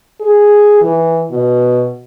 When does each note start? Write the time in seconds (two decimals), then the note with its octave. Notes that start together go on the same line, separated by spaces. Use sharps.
0.21 G#4
0.81 E3
1.30 B2